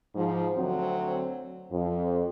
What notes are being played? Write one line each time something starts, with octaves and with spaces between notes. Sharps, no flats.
G#2 F3
D2 F#3 C4
F2